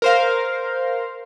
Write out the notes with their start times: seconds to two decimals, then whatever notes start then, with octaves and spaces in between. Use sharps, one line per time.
0.02 A#4 C5 F5